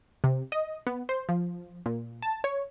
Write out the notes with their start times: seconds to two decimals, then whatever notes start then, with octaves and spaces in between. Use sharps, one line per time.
0.24 C3
0.52 D#5
0.87 B3
1.09 C5
1.29 F3
1.86 A#2
2.22 A5
2.44 C#5